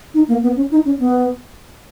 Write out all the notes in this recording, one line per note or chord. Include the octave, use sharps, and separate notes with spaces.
D#4
A#3
B3
C#4
D#4
C#4
B3